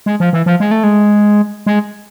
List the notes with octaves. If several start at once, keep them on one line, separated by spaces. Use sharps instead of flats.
G#3
F3
E3
F3
G#3
A3
G#3
G#3